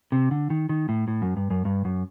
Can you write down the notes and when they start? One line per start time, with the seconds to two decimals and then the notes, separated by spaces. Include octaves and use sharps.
0.12 C3
0.31 D3
0.50 D#3
0.69 D#3
0.89 A2
1.08 A2
1.22 F#2
1.37 G2
1.50 F#2
1.65 G2
1.85 F#2